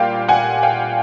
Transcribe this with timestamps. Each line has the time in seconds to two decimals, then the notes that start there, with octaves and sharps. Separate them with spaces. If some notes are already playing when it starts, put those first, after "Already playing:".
Already playing: A#2 G3 F5 G5
0.29 F#5 G#5
0.63 F5 G5